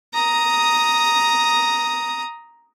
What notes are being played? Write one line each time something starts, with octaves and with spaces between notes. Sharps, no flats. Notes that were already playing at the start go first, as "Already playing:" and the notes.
A#5 D#6